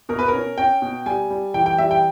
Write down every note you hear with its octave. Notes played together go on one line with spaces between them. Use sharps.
B2 A#4
B4
A#4
C#4
C#4 G5
B2
G3 G#5
G3
E3 G5
G5
G3 E5
G5